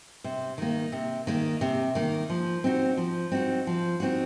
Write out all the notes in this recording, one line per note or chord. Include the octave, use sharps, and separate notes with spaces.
C3
D#3 A#3
C3
D#3 A#3
C3
D#3 A#3
F3
C4 D#4 F#4
F3
C4 D#4 F#4
F3
C4 D#4 F#4